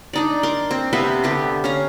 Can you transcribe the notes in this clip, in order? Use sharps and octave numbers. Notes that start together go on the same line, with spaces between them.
D4 D#4 D5
A#4 C6 D6
C4
C3 B3 E5 F5
D3 B3 G4
C#4 F5 A#5